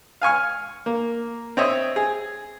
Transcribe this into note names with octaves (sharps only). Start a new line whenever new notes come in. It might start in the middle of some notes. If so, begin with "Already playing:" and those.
F5 G#5 C#6 F6
A#3
C4 C#5 D#5 E5
G#4